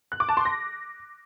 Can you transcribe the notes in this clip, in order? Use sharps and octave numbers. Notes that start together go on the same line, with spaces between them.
F#6
D6
A5
C6
A#6